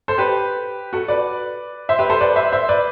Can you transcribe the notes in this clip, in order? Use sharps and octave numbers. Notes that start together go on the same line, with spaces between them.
A4 C5
G4 B4
F#4 A4
B4 D5
C5 E5
G4 B4
A4 C5
B4 D5
C5 E5
C5 E5
B4 D5